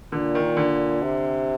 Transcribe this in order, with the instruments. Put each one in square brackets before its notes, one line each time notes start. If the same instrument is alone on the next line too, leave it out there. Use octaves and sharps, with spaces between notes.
[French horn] A#2 [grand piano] D3
[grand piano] D#3
D3
[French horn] C3